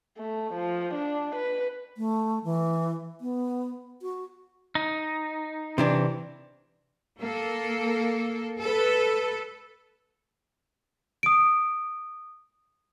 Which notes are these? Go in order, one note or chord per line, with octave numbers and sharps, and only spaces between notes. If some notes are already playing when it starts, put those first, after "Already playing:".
A3
F3
D4
B4
A3
E3
B3
F#4
D#4
C3 E3 D4
A#3 A4
A4 B4
D#6 D7